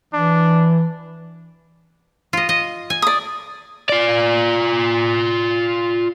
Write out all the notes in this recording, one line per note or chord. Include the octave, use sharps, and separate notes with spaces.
E3 D4
F4 D#5
D#5
G#5
D5 D#6
F4 D5